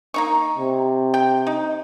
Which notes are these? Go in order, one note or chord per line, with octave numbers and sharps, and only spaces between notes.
A#3 D#4 C#6
C3
G5
D#4